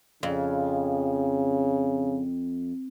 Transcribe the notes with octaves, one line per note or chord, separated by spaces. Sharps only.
F2 C#3